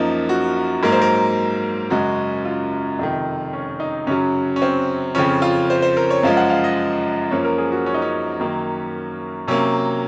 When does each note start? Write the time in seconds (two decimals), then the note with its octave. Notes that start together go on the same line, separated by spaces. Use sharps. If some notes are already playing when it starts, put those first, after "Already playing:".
Already playing: F#2 F3 A#3 D#4
0.29 F#4
0.83 G#2 F#3 A#3 A#4
0.92 C5
1.02 A#4
1.90 F#2 C#3 G#3 F#4
2.45 F4
2.99 F2 C3 D#3
3.53 C#4
3.80 D#4
4.07 F#2 C#3 F#3 C#4
4.56 C#4
4.62 C4
5.15 F2 C#3 F3 C#4
5.42 F4
5.70 C5
5.82 C5
5.97 A#4
6.10 C#5
6.23 F#2 F3 G#3 F5
6.37 F#5
6.50 F5
6.64 D#5
7.31 F#2 F3 A#3 C#5
7.45 A#4
7.58 G#4
7.72 F#4
7.86 C#4
7.94 D#4
8.02 C#4
8.39 F#2 D#3 F#3 A#3
9.48 C3 F#3 A#3 C#4